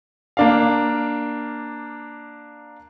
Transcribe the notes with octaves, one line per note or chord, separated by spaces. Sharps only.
A#3 D4 F5